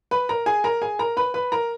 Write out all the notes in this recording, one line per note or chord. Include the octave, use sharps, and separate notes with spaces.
B4 B5
A#4 A#5
G#4 G#5
A#4 A#5
G#4 G#5
A#4 A#5
B4 B5
B4 B5
A#4 A#5